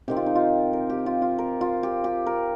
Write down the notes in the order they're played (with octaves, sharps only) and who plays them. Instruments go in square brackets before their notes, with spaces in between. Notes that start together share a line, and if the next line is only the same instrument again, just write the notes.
[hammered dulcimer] C3 D#3 C4 G4
F4
D#4
F4
A#4
G4
F4
F4
A#4
F4
G4
G4
A#4